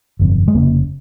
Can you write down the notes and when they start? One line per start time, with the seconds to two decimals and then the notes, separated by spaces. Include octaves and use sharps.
0.20 G1 F2 C3
0.48 G#3
0.55 F1 F2 C#3 A#3